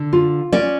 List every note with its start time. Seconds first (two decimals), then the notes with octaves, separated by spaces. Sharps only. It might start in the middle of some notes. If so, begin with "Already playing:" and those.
Already playing: D3
0.13 F4
0.52 C#4 D5